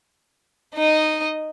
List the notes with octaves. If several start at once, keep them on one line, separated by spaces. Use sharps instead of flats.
D#4 D#5